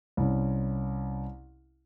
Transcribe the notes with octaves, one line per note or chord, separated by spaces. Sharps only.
C2 C#4